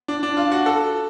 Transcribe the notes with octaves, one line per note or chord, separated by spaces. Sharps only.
D4
D4
F4
F#4
A4